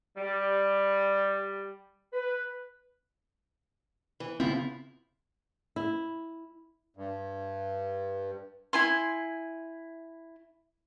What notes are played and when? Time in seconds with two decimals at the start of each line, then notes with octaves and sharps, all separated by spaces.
0.17 G3
2.13 B4
4.20 E3
4.40 C#3 B3 C4 E4 F4
5.76 E4
6.97 G2
8.73 E4 G#5 C6